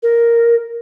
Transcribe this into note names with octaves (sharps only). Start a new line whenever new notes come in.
A#4